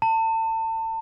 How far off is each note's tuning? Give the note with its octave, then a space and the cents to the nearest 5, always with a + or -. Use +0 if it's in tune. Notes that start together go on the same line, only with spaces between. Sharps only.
A5 +35